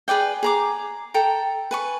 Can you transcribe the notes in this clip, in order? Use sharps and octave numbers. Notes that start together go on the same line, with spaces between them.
G#4 B4 D5 G5
G#4 A#5 D6
A4 G5 A#5
B4 G#5 C#6